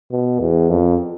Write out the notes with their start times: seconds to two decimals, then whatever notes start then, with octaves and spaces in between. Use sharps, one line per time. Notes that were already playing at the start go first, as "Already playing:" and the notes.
0.11 B2
0.40 E2
0.69 F2